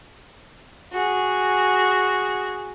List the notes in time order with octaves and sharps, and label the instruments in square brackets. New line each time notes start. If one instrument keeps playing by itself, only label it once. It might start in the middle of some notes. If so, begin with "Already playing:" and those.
[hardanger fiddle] F#4 G#4